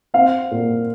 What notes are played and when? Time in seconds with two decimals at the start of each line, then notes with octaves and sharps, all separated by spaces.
0.14 C4 F5
0.51 A#2